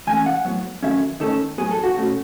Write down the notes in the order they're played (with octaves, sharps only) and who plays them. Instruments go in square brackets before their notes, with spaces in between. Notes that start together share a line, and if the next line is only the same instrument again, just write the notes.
[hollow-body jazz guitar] E3 A3 C#4 G#5
F#5
A2 F#3 B3
D#3 F#3 A3 C#4 E5
D#3 A3 C#4 A4
A2 F#3 B3 G#4
A4
F#4
B2 A3 C#4